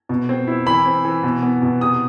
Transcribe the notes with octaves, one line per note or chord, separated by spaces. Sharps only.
B2
C4
E4
E3 B5
C4
E3
B2
B3
B2
C3 D#6